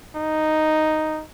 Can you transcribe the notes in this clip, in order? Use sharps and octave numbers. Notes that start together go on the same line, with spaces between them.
D#4